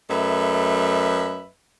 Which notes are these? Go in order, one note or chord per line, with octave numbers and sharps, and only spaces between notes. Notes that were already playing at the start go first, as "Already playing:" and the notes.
F#2 A3 B4 D#5 E5